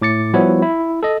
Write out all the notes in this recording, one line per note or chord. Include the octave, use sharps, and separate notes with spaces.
A2 D6 A6 C#7
F3 G3 B3 E4 F#4 C#5
E4
A4 D#5